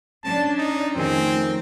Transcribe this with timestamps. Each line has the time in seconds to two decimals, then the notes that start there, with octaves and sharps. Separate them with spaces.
0.24 C#4 D4 A5
0.58 D#4
0.95 F2 D#3 A3 C4 C#4 G#4 A#4